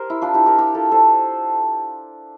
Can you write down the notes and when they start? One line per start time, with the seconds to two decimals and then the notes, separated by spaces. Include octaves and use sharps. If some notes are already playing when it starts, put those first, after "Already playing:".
Already playing: G4 A#4 C5
0.10 E4
0.22 D4 F4
0.34 E4 G4
0.46 G4 A#4
0.58 G4 A#4
0.74 F4 A4
0.92 A4 C5